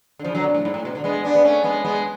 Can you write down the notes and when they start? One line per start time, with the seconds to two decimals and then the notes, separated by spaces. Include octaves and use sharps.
0.19 D3
0.24 C#3 F3
0.35 D3 F#3
0.44 B2
0.55 A2
0.65 G#2
0.74 A2
0.85 B2
0.95 D3
1.04 G#3 B3
1.24 B3 D4
1.35 B3
1.44 A3 C#4
1.64 G#3 B3
1.85 G#3 B3